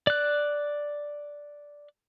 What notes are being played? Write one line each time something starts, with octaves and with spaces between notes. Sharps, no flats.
D5 F#6